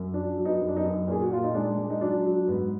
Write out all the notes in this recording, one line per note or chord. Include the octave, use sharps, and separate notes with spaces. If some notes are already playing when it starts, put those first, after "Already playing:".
Already playing: F#2
F#3 D4
F#3
B3 D#4
F#2
D4
B3 D#4
F#2
A#2 G#4
F#4
A#2 F4
D#4
G#3 D4
G#3
D#4
F#3 D4
F#3
G#2 B3